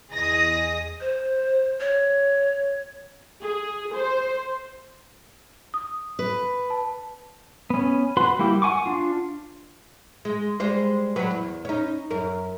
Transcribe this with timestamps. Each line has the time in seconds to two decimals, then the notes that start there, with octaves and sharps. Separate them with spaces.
0.12 E2 G#4 D#5 D#6 A#6
1.01 C5
1.80 C#5
3.41 G#4
3.94 C5
5.74 D#6
6.19 B4
6.70 A5
7.70 B3 C#4
8.17 F#4 B4 B5 C6
8.39 G3 A#3 E4 G4
8.62 F#5 G#5 C#6 D6
8.86 D4 F4
10.25 G#3
10.60 G3 G#3 C5
11.16 F#3 B4
11.31 E2
11.65 C#4 D#4
12.11 F#2 A#4